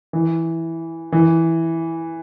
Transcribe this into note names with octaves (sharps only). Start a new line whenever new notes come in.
E3
E3